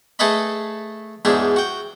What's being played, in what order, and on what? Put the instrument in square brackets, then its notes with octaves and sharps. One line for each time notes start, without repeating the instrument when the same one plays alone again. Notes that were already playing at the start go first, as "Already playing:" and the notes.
[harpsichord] A3 G#4 A4 B4 D#5 B5
E2 G#2 F#3 D4 G#4 E5
F#4 G5